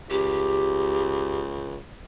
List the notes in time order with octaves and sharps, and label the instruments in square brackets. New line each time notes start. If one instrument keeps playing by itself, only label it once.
[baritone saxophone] C#2 [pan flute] G4